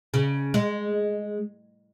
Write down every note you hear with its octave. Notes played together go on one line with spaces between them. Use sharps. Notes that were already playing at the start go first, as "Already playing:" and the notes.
C#3
G#3